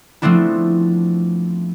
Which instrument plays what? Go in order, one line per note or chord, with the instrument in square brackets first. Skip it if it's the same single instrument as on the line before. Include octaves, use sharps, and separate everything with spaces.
[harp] F3 A3 B3 C4 D4 E4